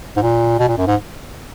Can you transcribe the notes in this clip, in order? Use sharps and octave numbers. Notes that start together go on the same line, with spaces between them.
G#2
A#2
B2
A#2
F#2
G#2